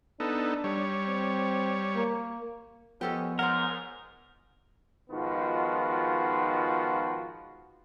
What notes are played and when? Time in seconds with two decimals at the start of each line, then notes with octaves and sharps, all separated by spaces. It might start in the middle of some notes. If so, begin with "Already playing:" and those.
0.20 B3 D4 D#4 A4
0.64 G3 C#5
1.06 C4
1.96 A#3
3.01 F3 G#3 B3 C#4 G4 A4 D#5
3.39 G#2 A#4 C5 C#5 F#5
5.10 G#2 D#3 F3 B3 F4 F#4